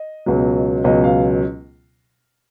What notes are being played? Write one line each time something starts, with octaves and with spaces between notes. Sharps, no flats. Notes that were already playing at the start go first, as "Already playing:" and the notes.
Already playing: D#5
C#2 B2 F#3
C#2 B2 F#3 D#5
F5